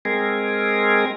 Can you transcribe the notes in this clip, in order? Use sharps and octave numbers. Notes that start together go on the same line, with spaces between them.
G#3 C4 G#4 A#4